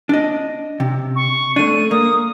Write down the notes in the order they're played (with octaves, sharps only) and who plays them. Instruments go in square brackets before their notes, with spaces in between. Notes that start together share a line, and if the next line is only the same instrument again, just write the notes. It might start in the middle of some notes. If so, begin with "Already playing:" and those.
[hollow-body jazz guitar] D4 D#5
C3
[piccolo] C#6
[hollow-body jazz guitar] A3 D4 [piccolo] D#7
[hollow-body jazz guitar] A#3 [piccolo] D#6